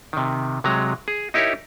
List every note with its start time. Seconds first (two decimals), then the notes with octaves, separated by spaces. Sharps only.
0.13 C3 D#3
0.64 C3 F#3 G#3 A#5
1.08 G#4
1.34 D#4 E4 G4 A#4 C#5